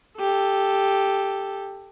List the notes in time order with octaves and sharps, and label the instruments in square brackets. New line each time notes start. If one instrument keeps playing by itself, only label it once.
[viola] G4 A4